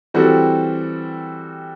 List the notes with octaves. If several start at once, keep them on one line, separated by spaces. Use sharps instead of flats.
E3 G3 C4 F#4 A4